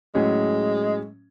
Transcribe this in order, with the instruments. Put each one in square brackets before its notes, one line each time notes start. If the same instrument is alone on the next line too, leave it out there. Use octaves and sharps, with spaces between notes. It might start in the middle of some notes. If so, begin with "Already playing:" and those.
[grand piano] A2 F#3 C#4 [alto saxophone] G#3